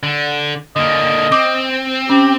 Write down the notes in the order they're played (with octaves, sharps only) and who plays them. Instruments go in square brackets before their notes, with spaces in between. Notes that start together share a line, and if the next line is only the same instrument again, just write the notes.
[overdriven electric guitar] D3
[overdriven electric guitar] D3 A#3 [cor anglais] D#5
[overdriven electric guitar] C4 [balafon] D6
[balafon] C#4 [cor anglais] G4